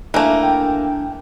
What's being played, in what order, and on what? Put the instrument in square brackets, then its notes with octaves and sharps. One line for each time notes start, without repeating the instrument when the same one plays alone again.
[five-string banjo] E3 A3 [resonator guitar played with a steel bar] A#3 [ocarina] D4
[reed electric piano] G5